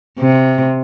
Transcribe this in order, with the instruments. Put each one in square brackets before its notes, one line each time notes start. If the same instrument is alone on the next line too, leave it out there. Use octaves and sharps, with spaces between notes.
[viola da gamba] C3